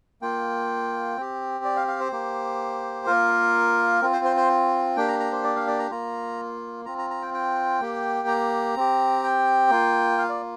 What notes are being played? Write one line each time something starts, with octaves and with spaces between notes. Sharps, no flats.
A#3 F4 G5
C4 G4
D5
F5
F5
C5
A#3 G4
A#3 F4 A#4
C4 F4
C5
C5
C5
A#3 D4 G4 G5
A#5
A#5
C5
D5
F5
D5
A#5
A#3 F4 A#5
C4 F4 A#5
A#5
A#5
G5
G5
A#3 G4
A#5
C4 G4
G5
A#3 F4
F5
D5